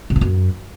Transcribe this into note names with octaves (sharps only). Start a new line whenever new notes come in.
B2
A#2
F#2